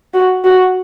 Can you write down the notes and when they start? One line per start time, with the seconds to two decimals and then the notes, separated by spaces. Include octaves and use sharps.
0.14 F#4
0.44 F#4